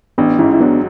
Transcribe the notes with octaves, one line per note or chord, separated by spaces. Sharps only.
A1 B3 D4
G#2 C#4 E4
E4
F#3 B3 D4